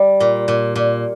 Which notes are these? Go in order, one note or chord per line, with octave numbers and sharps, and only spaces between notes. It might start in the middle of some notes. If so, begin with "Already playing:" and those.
Already playing: G3
A#2
A#2
A#2